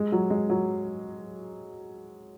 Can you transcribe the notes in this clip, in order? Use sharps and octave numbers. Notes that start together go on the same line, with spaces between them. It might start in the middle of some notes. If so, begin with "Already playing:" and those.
Already playing: G#3
F#3
G#3
F#3